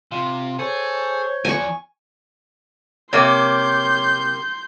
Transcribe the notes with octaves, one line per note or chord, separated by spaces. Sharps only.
C3 F4
G#4 A4 C5 C#5
E2 F3 G#5 C#6
C3 A#3 C#5 C6 D6 G6